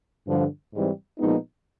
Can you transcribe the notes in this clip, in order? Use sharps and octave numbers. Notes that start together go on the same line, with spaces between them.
G2 D3 F3
G#2 E3 G3 C4
A#2 F3 G#3 B3 D#4